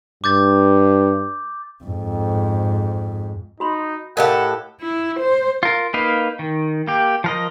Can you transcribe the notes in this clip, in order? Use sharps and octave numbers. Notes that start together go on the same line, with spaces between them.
G2 D6 G6 A6
F2 G#2
D#4 F#4 B5 C6
A2 G4 A4 A#4 D#5 F5 F#5
E4
C5
F4 A#4
A#3 D#4 B4 F5
D#3
A#3 G4
F3 A#4 D#5